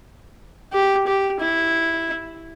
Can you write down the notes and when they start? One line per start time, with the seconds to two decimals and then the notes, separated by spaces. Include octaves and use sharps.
0.73 G4
1.07 G4
1.40 E4